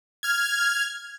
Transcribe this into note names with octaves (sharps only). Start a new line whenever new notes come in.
F6 G#6